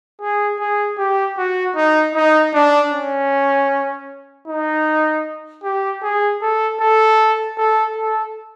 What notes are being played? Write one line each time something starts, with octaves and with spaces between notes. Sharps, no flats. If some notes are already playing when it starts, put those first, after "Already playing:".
G#4
G#4
G4
F#4
D#4
D#4
D4
C#4
D#4
G4
G#4
A4
A4
A4
A4